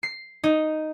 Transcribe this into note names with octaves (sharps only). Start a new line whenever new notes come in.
C7
D#4